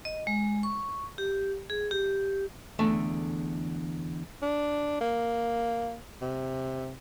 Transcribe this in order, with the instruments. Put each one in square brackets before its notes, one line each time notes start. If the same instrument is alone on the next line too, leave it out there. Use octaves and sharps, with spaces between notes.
[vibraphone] D#5
G#3
C#6
G4
G#4
G4
[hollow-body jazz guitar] E2 D3 A3 A5
[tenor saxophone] D4
A#3
C3